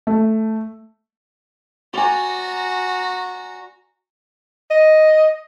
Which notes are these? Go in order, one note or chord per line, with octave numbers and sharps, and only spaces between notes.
A3
F#4 D5 G#5 A#5
D#5